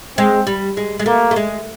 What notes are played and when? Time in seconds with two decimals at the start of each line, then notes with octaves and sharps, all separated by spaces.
0.18 G#3 C4
0.47 G3
0.77 G#3
0.99 G#3
1.06 A3 A#3
1.31 A3
1.36 G#3